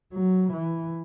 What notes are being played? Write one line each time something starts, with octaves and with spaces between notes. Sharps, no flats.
F#3
E3